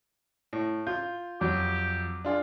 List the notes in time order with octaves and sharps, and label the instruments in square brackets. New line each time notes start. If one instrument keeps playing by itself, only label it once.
[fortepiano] A2
[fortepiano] F4 [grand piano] G6
[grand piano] F2 [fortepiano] F#3 [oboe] G4
[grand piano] D4 F4 G#4